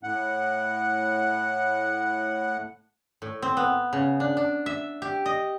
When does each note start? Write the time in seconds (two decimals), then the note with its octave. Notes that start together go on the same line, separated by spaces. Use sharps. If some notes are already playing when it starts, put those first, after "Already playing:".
0.03 A2 F#5
3.22 A2
3.42 C4
3.57 B3
3.93 C#3
4.20 D4
4.37 D4
4.66 E5
5.02 G4
5.26 D#5